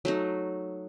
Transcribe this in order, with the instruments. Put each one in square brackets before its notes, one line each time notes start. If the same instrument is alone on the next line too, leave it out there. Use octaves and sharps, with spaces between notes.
[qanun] F#3 A3 D#4